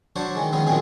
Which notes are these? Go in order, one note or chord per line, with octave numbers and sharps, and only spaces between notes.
F#3 D4 C5 C#5 A5
D#3 E3 G#3
D#3 F3 G#3 B3 C#4
A#2 D#3 F#3 C4 G#4